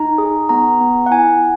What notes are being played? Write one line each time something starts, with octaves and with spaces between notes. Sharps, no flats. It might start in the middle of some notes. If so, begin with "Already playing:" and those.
Already playing: D#4 A#5
G#4
B3 A#5
B3
F#5
E4 G#5